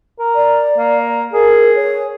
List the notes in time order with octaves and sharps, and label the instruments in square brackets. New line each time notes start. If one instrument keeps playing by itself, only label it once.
[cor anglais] A#4
[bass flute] D5
[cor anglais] A#3
[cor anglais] G#4 [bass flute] A#4
[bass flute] C#5